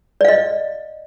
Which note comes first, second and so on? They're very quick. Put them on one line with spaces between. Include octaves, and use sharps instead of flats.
D5 F5 D#5